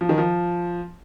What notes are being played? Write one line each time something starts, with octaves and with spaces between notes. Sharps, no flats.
F3
D#3
F3